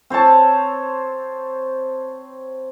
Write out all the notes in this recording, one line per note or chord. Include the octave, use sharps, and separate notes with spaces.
C4 C5 C#5 A5